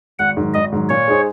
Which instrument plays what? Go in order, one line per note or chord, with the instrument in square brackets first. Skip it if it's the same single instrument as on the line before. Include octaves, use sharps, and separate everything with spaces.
[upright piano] G#1 [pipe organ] F#5
[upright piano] G#2 D#3 F#3
[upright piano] G#1 [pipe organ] D#5
[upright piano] G#2 D#3 F#3
[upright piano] A#2 [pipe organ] C#5
[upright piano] G#3 D#4 G#4 C5